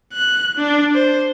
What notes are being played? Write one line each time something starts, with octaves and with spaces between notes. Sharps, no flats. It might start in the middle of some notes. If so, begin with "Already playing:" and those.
F#6
D4
C5